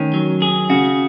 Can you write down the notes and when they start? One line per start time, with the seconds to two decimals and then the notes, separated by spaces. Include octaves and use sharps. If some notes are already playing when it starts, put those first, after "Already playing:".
Already playing: D#3 C#4
0.14 F#3
0.42 G#4
0.70 C#3 F#4